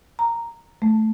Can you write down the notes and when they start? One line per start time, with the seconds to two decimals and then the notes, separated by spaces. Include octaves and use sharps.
0.19 A#5
0.82 A3